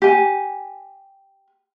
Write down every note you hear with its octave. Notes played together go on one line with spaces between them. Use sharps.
G4 G#5